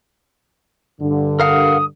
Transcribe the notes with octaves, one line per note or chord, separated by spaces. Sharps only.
G2 D3
A#4 F5 F#5 D#6